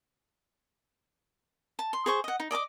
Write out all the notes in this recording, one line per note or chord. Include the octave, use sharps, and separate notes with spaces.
A5
C6
G#4 C5 C#6
D#5 F#5
D#4
D5 D#5 A#5 D6